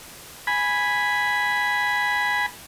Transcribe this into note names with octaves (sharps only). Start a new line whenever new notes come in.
G#5 B5